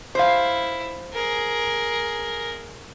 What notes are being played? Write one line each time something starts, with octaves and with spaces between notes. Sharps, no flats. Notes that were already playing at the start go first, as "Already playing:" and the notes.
E4 C5 F5
G#4 A#4